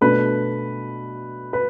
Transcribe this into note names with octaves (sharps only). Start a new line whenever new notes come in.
B2 A3 D4 B4
B4